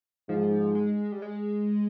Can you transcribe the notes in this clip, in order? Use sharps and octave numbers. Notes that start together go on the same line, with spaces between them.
G#2 F3
G#3
G3
G#3